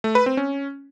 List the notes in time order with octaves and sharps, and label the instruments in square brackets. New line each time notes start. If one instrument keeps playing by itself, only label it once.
[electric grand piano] A3
B4
C4
C#4